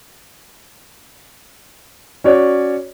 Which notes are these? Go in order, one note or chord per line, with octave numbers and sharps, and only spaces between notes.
C#4 F#4 C#5 D5